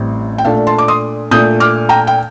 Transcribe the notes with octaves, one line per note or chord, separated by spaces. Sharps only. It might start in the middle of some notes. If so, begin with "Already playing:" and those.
Already playing: A1 A2 G3 C4
G5
A#2 A3 D4 F5 A5
A5 C6
D6
C6 D#6
A#2 A3 D4 D#6 G6
D6 F6
G5 A#5
G5